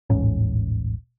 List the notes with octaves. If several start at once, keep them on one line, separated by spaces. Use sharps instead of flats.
D#1 A1 G#2 C#4